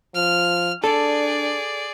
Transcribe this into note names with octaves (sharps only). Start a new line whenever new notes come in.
F3 F6
D4 G#4 A4 D5